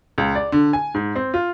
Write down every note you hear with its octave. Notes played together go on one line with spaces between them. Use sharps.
C#2
D5
D3
G#5
G#2
C4
F4